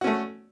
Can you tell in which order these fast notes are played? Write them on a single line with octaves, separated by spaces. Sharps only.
F#4 C#4 A3